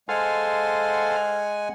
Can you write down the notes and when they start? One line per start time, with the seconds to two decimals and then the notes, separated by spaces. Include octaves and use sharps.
0.09 G#3 A4 C5 F5 F#5 G#5